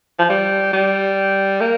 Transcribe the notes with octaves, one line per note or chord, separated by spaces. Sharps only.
F3
G3
G3
A#3